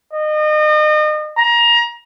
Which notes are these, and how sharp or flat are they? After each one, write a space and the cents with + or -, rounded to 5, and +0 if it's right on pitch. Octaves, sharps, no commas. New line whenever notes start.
D#5 -35
A#5 +25